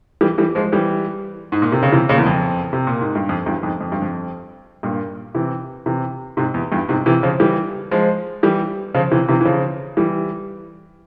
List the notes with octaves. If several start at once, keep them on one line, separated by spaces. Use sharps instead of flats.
E3 G3
E3 G3
F3 G#3
E3 G3
G#2
A#2
C3
C#3
C3 E3
A#2 C#3
E2
F2
C3
A#2
G#2
G2
F2
E2 G2
F2 G#2
F2
G2
F2
G2 A#2
C3 E3
C3 E3
G#2 C3
E2
E2 G2
G#2 C3
C3 E3
C#3 F3
E3 G3
F3 G#3
E3 G3
C#3 F3
C3 E3
C3 E3
E3
C#3 F3
E3 G3